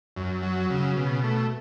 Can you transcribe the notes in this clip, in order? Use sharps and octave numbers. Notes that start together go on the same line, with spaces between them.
F#2
F#3
C#3
B2
A3